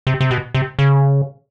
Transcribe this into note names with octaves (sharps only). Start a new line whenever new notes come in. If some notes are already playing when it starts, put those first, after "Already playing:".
C3
C3
B2
C3
C#3